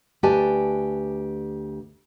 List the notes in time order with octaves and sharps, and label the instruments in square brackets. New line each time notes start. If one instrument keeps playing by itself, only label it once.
[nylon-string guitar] D2 G4 B4 D5 G#5 A5